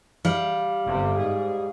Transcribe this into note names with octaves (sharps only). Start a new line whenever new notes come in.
G3 F5
G1 C3
G#2 G#4